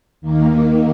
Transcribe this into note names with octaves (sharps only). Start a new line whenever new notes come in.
D#2 D#3 A#3